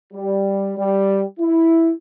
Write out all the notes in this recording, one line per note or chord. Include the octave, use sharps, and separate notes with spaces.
G3
G3
E4